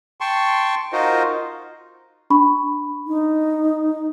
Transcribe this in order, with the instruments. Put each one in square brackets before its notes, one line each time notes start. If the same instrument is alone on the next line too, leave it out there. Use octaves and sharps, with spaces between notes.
[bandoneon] G5 A5 C6 C#6
D#4 F4 F#4 A#4 C5 D#5
[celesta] D4 B5 C#6
[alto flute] D#4